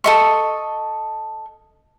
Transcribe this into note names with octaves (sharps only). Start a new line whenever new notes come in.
A4 D#5 C#6